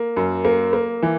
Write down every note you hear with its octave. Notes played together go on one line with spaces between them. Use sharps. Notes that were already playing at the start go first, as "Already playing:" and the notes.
Already playing: A#3
F#2
A#3
A#3
E3